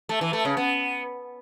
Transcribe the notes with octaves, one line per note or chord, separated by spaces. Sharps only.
A3
E3
A3
C#3
B3